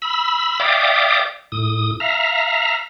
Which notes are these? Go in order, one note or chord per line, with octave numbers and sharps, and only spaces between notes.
B5 E6
D5 E5 F5 G5 D6 D#6
A2 D#6
E5 F5 A#5